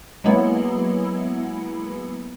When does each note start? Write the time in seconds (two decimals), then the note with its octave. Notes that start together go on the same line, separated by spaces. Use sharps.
0.24 F#3 G#3 A#3 B3 E4